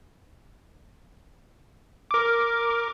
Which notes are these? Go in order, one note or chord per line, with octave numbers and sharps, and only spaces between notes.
A#4 D6